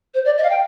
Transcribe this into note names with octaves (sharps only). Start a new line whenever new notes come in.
C5
D5
D#5
F5
G5